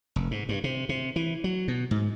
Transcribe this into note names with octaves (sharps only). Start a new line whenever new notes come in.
F1
G#2
G2
C3
C3
E3
F#3
B2
G#2